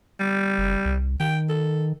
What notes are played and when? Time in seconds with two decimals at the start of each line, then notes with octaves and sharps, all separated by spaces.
0.20 G3
0.58 F#1
0.85 C2
1.20 D#3 G5
1.49 A4